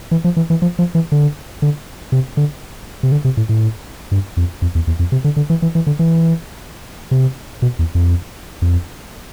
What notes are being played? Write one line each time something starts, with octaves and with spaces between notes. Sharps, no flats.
E3
F3
E3
E3
F3
F3
E3
D3
D3
C3
D3
C3
D3
C3
A2
A2
G2
F2
F2
E2
E2
F2
C3
D3
D3
E3
E3
E3
D3
E3
C3
B2
E2
F2
F2